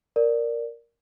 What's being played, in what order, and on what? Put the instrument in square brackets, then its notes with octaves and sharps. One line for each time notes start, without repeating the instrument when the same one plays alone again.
[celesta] A#4 D5